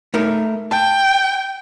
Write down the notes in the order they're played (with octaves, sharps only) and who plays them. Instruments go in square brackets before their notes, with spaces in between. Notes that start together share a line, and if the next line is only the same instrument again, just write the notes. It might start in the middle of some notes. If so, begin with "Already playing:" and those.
[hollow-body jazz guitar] A3 D#4 A#4
[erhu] G5 [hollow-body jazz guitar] A5